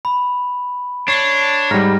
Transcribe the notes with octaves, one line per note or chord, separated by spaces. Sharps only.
B5
D4 C#5 C7
G#2 G3 A#5 F6 A#6